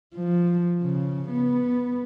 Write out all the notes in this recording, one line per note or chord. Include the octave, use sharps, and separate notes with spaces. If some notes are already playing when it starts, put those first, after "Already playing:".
F3
C#3
B3